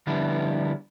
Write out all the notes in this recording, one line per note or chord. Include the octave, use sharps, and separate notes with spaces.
D3 F3 G3 B3 D4 E4